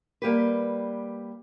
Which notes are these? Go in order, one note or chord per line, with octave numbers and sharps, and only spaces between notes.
G3 A#3 G4 B4